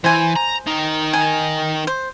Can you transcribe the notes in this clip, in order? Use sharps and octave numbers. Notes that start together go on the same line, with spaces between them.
E3 C5 G#5
A#5
D#3 D#4
G#5
C5